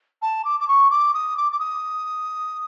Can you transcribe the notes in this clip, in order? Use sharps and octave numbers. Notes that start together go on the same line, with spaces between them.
A5
D6
D6
C#6
D6
D#6
D6
D6
D#6